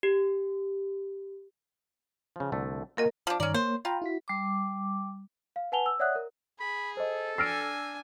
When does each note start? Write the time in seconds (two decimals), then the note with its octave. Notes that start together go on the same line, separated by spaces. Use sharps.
0.03 G4
2.36 C#3 F3
2.52 C2 D3 A3
2.97 A#3 F4 F#4 A#4 D#5 G#5
3.27 F3 D4
3.40 G2 D#3 C#4 D5 A#5
3.54 A#3 C5 C#5
3.85 F4 G5 A#5 B5
4.02 E4 F#4 B6
4.28 G3 D6
5.56 F5
5.72 B4 F#5 G#5 A5 F7 G7
5.86 E6
5.99 C#5 D5 E5 F#5 D#6 F#6
6.15 A#4
6.60 G#4 B5
6.97 A4 C5 D#5
7.38 D4 G#5 E6 F6 A#6 C7 D7